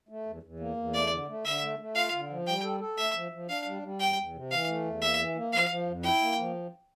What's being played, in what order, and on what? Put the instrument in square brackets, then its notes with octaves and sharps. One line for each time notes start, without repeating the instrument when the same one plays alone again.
[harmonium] A3
E2
E2
A#3
E2
[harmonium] A3 [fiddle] D5
[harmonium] D3
A3
[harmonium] D3 [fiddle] E5
[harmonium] A3
A3
[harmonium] F4 [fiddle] F5
[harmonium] D3
F3
[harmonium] G3 [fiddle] G5
[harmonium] A4
A4
[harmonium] A3 [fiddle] E5
[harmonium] F3
F3
[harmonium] D4 [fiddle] F5
[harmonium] G3
G3
[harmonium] E2 [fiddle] G5
[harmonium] E2
C3
[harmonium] E3 [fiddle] F5
[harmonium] A3
E2
[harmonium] A#3 [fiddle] E5
[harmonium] E3
A#3
[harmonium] F3 [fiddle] F5
[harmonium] F3
F2
[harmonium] E4 [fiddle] G5
[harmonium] A#3
F3